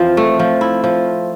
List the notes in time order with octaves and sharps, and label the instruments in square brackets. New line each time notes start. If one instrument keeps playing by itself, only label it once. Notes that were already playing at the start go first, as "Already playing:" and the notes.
Already playing: [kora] E3 F3 C4 [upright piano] F4
[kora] A3
F3
E4
F3